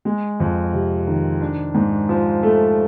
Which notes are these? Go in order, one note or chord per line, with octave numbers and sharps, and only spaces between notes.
G#3
F2
C3
D#3
D4
G#2
F3
A3